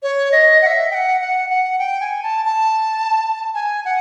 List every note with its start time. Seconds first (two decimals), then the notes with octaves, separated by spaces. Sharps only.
0.03 C#5
0.32 D#5
0.62 F#5
0.67 E5
0.91 G5
0.95 F#5
1.21 F#5
1.50 F#5
1.79 G5
2.01 G#5
2.23 A5
2.45 A5
3.55 G#5
3.85 F#5